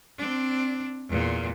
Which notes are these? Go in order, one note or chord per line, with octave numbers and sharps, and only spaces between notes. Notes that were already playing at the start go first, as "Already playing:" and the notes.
C4 D4
E2 A#2